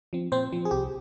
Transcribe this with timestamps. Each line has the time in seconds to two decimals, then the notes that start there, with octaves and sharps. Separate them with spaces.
0.13 F3 C4
0.32 A#2 C4 C5
0.52 F3 C4
0.65 G#4
0.71 C2 G4